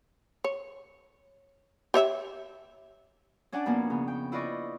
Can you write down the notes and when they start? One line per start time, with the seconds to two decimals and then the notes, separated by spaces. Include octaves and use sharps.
0.44 C#5
1.94 G4 C#5 E5
3.52 C#4 D4 D5 F#5 G#5 A5
3.66 F2 B2 A#3 B3 C#4
3.90 C#3 B3
4.08 G5
4.32 E4 F4 B4 D5 D#5 C#6